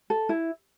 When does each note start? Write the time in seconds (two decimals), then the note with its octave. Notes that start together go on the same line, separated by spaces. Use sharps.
0.10 A4
0.29 E4